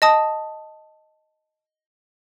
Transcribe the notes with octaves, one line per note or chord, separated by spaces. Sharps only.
D#5 A5 D#6